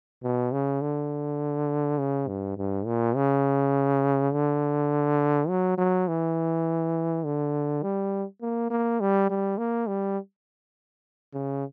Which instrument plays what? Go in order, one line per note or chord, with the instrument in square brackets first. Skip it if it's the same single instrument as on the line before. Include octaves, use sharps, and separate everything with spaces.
[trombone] B2
C#3
D3
C#3
G2
G2
A#2
C#3
D3
F#3
F#3
E3
D3
G3
A#3
A#3
G3
G3
A#3
G3
C#3